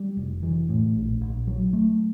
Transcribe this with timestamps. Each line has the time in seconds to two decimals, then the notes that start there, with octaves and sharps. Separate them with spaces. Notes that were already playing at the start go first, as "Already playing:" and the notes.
Already playing: G3
0.17 F1
0.43 E3
0.69 A2
0.95 A#1
1.21 A#1
1.47 F#3
1.73 A3